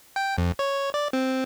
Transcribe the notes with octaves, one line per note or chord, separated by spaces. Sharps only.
G5
F2
C#5
D5
C4